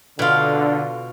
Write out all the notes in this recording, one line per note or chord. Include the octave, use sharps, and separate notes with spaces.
B2 D3 F4